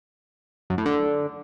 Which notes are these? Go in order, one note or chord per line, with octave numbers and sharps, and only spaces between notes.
F#2
A2
D3